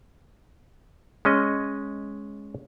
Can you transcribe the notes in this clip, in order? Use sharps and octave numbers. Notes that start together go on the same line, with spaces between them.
G#3 C#4 D#5